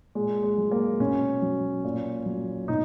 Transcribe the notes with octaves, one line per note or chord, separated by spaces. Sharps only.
A#2 G#3
G#3
F#3
A#3
B2 C#4
F#3
A#2
F#3
B2 D#4